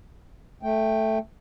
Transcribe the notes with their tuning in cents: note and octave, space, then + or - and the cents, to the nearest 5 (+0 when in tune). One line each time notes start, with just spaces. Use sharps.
A3 +0 G5 +0